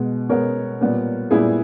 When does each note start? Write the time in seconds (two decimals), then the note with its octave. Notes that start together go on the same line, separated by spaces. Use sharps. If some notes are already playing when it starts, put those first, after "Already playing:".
Already playing: B2 G#3 B3
0.29 B2 G#3 B3 A#4 C#5
0.81 A#2 G3 B3
1.31 A#2 G3 B3 E4 G#4